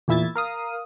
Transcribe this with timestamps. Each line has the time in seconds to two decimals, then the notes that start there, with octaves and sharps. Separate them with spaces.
0.08 E2 A#2 E4 E5 G#6 A6
0.35 A#4 F5 D#6